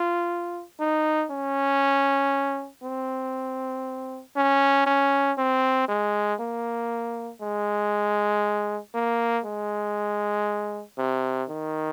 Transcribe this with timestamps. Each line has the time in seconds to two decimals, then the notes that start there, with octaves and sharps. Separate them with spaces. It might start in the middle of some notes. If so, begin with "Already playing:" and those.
Already playing: F4
0.80 D#4
1.31 C#4
2.83 C4
4.36 C#4
4.86 C#4
5.38 C4
5.89 G#3
6.40 A#3
7.41 G#3
8.94 A#3
9.45 G#3
10.98 C3
11.49 D#3